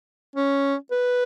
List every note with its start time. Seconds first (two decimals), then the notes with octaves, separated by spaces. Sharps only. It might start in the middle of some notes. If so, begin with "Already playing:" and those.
0.36 C#4
0.91 B4